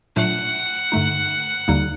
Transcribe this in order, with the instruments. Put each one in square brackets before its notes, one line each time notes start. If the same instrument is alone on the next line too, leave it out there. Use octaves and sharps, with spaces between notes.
[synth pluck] A#2 F#3 A3 D4 [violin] F#5
[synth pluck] G2 D3 A3 D#4
D#2 D3 G3 A#3 D#4